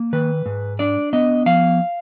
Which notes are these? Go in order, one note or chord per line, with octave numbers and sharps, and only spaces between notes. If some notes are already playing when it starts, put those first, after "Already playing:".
Already playing: A#3
D#3 B4
G#2
D4 D5
B3 D#5
F3 F5